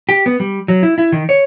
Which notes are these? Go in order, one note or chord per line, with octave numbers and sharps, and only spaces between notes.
G4
B3
G3
F#3
E4
E4
D#3
C#5